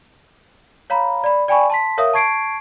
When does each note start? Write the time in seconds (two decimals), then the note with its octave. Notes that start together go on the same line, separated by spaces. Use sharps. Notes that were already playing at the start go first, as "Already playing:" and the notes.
0.90 C#5 F5 A#5 B5
1.24 D5 B5
1.48 D5 G5 G#5 B5 C#6
1.70 A5 C6 B6
1.98 A#4 C#5 E5 F5 D#6
2.13 A5 C#6 G#6 C7 D7